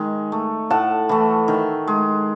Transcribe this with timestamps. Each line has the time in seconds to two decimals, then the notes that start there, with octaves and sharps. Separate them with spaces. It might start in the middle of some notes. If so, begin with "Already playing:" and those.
Already playing: D#3 G#3
0.32 A3
0.70 A2 F#5 A5
1.09 E3 A3
1.48 D#3
1.88 G#3